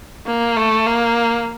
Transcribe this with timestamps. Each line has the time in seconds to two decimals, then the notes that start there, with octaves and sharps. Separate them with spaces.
0.27 A#3
0.57 A3
0.87 A#3